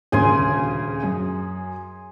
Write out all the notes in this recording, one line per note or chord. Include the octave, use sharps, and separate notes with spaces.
D#1 D2 C#3 G#4 G#5 C6
F#2